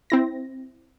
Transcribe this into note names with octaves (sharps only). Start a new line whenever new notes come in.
C4 E4 A#6